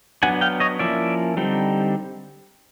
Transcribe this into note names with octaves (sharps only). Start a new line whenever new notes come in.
F#3 B3 D4 F#5 G#5
F5 G5
C#5 D#5
F3 A#3 C#4 E4 D5 E5
D3 G3 C4 D#4